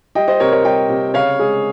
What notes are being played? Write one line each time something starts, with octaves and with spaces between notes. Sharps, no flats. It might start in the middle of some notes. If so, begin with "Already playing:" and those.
G3 D#5 G5
C5 D#5
C3 A#4 C#5
A#4 C#5
G3 D#5 G5
C3
C#3 C#5 F5
G#3 G#4